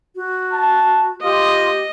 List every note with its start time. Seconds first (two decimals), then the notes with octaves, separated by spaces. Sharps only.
0.16 F#4
0.53 A5
1.23 F4 G4 D#5